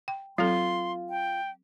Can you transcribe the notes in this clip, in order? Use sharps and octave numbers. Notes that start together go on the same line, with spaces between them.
G5
F#3 C4 F4 A4 C6
G5